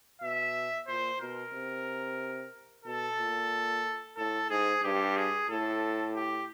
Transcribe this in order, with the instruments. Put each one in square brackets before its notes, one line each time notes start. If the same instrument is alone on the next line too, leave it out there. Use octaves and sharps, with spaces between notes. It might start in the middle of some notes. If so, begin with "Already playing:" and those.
[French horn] B2 [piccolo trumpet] E5
[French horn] A#2 [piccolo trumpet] C5
[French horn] B2 [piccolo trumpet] A#4
[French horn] C3
[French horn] B2 [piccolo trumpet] A4
[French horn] A#2
[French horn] A2 [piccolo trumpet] A4
[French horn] G#2 [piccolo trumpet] G#4
[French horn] G2 [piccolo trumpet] G4
[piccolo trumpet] G#4
[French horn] A2 [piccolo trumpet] A4
[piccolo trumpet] G4